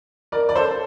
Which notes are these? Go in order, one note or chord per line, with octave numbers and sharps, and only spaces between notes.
A#4 D5
D5
A4 C5